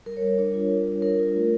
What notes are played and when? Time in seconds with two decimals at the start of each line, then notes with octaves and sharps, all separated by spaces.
0.06 G3 A#4
0.17 C#5
0.21 G3
0.28 C#5
0.38 D4 C#5
0.54 F4
0.71 G3
0.86 G3
1.02 D4 A#4
1.19 F4
1.35 A3